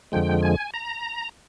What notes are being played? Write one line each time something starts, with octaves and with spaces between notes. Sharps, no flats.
F2 D3 F3 G#3 G5
G#5
A#5